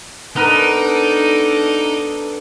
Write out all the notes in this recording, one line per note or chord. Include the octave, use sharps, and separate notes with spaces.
B3 D4 D#4 A4 A#4